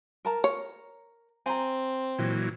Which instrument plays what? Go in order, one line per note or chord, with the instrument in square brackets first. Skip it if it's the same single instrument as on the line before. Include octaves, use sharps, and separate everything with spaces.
[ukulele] A#4 A5 A#5
[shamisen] C#5
[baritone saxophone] C4 [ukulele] G#5 A#5
[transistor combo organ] A#2 E3 F#3 [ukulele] D#5